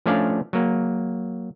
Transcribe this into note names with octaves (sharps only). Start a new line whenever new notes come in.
F3 A3 C#4 D4 D5 F5
F#3 A#3